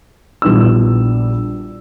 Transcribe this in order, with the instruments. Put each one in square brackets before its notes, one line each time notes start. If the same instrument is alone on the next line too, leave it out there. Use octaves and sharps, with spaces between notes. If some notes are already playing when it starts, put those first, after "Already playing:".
[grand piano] A#1 G3 B3 D4 E4 E6